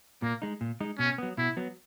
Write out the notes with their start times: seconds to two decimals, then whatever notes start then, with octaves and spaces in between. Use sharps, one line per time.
0.22 A#2 A#3
0.42 G#3 D#4
0.61 A#2
0.80 G#3 D#4
0.99 B2 C#4
1.18 F#3 B3
1.38 B2 E4
1.57 F#3 B3